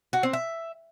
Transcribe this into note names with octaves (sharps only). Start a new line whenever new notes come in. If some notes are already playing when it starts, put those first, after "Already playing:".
F#4
C4
E5